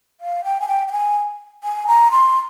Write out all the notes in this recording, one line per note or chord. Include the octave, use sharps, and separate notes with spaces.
F5
G5
G#5
G5
G5
G#5
G#5
A#5
C6